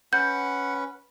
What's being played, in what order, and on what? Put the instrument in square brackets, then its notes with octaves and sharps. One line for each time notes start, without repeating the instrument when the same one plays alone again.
[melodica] C#4 B4 [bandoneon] F#5 [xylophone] G6